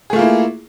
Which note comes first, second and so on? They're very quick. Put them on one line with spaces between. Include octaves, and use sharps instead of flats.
G#4 A3 F4 A#3 E4